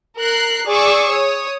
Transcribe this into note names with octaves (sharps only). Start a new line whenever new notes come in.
A#4 F#6 C7
G#4 D5 C#6 D6 E6
C#5 D#6